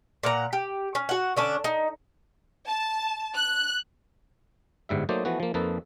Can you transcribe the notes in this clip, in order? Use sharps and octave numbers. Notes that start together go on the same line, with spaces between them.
A#2 F#5 A#5
G4
C#4
F#4 F#5
D3 C#4 D4
D#4
A5
F#6
G1 G#2 G3 E5
F#3 A3 A#3 D#4 C5 D5
E3 F3 A3 B3 F#4
F3 A#3
F2 F3 A#3 D#4 A4 B4